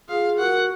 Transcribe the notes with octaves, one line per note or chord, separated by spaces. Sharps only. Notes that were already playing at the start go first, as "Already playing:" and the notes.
F4 G#4 F5
F#4 A#4 F#5